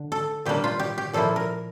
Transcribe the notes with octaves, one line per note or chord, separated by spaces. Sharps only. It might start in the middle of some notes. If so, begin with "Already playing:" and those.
Already playing: D3
A4
A#2 G3 A#3 D4 G4
F4
G4
G4
A#2 F3 A#3 E4 A4
A#4